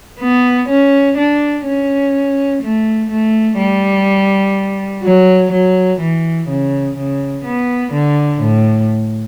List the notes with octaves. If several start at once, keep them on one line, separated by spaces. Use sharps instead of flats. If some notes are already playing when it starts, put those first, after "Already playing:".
B3
C#4
D4
C#4
A3
A3
G3
F#3
F#3
E3
C#3
C#3
B3
D3
A2